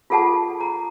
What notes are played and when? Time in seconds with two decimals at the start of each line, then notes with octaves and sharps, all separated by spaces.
0.10 F4 G#4 A4 F#5 A5
0.60 A#5